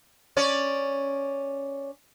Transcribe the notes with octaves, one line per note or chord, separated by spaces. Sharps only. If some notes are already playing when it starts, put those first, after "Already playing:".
C#4 C#5 D5